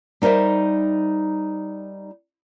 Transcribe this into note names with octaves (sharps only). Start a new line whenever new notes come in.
G3 D#4 A#4 C5 E5